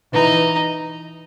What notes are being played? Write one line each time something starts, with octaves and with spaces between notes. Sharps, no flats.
E3 D#4